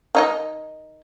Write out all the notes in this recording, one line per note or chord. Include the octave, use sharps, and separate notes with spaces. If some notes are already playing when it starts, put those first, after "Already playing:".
D#3 D#4 D#5